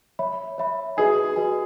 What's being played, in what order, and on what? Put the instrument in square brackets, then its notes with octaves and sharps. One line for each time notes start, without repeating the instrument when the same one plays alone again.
[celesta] C#5 E5 B5
C#5 E5 B5
[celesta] F#4 B4 D#5 G#5 [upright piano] G#4
[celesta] F#4 B4 D#5 G#5